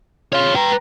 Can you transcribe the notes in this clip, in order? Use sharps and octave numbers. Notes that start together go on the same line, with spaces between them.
F4 C#5 F5
B4 G5 A#5